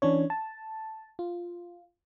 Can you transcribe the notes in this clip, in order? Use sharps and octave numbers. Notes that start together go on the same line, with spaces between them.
E3 C#4 D4 C#5
A5
F4